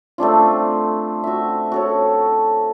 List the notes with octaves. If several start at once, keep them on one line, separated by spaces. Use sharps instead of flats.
A3 C4 D4 F4
F#4 E5
F#4 A4 C#5